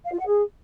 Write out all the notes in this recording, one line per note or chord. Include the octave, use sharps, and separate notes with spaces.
F5
F4
F#5
G#4